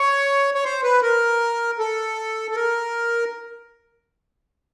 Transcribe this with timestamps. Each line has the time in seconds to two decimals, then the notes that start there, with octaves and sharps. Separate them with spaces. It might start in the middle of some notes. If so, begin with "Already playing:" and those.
Already playing: C#5
0.54 C#5
0.64 C5
0.83 B4
1.02 A#4
1.79 A4
2.51 A4
2.56 A#4